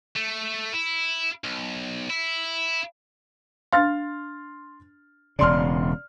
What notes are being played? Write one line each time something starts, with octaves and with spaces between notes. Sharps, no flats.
A3
E4
B1
E4
D4 F5 C6 F6 A6
E1 C#3 D5 C6 F6